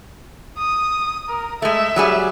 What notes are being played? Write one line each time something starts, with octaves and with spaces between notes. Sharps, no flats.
D#6
A#4
G#3 A3 E5
F#3 G3 G#4